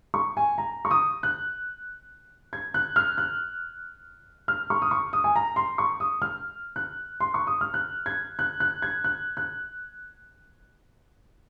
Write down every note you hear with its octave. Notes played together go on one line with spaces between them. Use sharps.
C#6
G#5
A#5
C#6
D#6
F#6
G#6
F#6
F6
F#6
F6
C#6
D#6
C#6
D#6
G#5
A#5
C6
C#6
D#6
F6
F#6
C6
C#6
D#6
F6
F#6
G#6
F#6
F#6
G#6
F#6
F#6